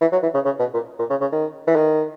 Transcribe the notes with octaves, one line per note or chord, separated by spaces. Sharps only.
E3
F#3
E3
C#3
C#3
B2
A#2
A#2
C#3
C#3
D#3
E3
D#3